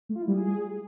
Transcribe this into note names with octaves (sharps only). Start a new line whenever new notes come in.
A3
F4
E4
G3
G#4